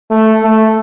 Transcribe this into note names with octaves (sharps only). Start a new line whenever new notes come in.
A3
A3